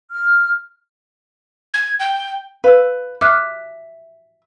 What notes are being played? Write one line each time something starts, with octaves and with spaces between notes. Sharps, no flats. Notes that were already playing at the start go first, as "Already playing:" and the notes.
F6
G#6
G5
B4 F5 E6
E5 D6 F6 F#6